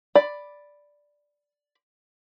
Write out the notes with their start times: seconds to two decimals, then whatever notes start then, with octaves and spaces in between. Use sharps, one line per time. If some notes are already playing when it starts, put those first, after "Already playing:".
0.15 D5 B5